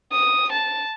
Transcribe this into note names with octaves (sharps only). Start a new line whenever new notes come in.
D#6
A5